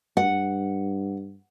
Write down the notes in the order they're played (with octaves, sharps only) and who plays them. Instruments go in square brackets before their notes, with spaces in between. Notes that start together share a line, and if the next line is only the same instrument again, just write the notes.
[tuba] G2 [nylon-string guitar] F#5